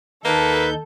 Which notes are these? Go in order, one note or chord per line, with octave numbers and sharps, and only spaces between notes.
D#2 A#3 D#4 A4 B4 G6